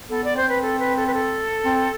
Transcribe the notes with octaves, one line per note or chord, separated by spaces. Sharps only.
B3 A4
D5
C4 C5
B4
A4
B4
A4
B4
A4
C4